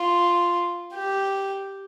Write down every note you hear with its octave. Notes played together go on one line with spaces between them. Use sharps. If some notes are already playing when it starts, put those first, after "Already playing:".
Already playing: F4
G4